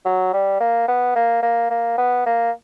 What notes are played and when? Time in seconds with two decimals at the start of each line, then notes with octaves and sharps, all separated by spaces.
0.05 F#3
0.33 G3
0.60 A#3
0.88 B3
1.15 A#3
1.43 A#3
1.70 A#3
1.98 B3
2.26 A#3